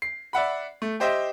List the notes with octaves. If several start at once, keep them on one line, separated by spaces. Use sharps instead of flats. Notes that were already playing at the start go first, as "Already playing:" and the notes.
C7
D5 E5 F#5 B5
A3
G4 C5 D#5 E5 G5